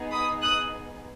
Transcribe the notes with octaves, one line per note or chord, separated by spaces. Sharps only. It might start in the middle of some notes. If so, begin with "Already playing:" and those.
Already playing: B3 D#4 G#4
B5 D#6
D#6 F#6